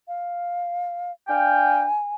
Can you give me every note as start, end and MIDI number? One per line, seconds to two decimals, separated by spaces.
0.08 1.12 77
1.28 1.84 62
1.28 1.84 77
1.28 1.84 79
1.28 2.15 80